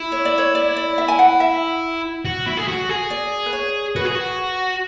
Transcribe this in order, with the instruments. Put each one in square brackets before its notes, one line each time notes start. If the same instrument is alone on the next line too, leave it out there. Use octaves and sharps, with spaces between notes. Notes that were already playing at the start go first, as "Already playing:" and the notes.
Already playing: [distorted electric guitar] E4
[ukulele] C#5
D5
C#5
D5
D5
E5
G#5
F#5
E5
[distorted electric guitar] F#4
E4
G#4
F#4
G#4
[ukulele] D5
B4
C#5
[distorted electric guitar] F#4 [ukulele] B4
[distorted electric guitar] G#4
F#4